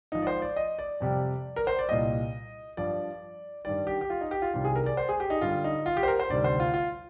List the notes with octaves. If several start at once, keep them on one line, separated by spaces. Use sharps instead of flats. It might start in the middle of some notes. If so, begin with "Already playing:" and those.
G#2 F3 D#4
D5
C5
D5
D#5
D5
F2 C3 G3
A#4
C5
D5
C2 A#2 G3 D#5
G2 F3 D5
G2 D#3 G3 D5
G4
G4
F4
D#4
G4
F4
C2 C3 D#3 G3 F4
G#4
A#4
D5
C5
G#4
G4
D#4
G2 D3 G3 F4
D#4
F4
G4
C5
A#4
C5
D2 C3 D#3 G3 D5
C5
F4
F4